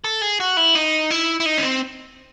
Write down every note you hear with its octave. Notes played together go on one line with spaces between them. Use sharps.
A4
G#4
F#4
E4
D#4
E4
E4
D#4
C#4
C4